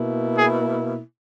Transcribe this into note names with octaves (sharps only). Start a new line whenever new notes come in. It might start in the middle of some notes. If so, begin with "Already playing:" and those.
Already playing: B2 A#3 E4
G#4